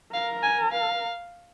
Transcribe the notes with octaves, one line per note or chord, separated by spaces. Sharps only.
A#4 F5
G#5
F5